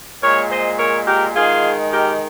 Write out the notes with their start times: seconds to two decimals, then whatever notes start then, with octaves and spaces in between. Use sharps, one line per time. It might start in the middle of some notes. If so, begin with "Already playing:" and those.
0.22 A#2 G#3 A#4 C#5
0.51 C5 D#5
0.78 A#4 C#5
1.07 G4 A#4
1.35 D#3 G#3 F4 G#4
1.92 G4 A#4